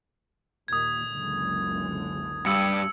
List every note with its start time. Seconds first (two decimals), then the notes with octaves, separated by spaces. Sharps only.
0.68 D#2 A#2 D#3 D#6 G#6
1.07 F#1 C#2 D3
2.46 G2 E6 C#7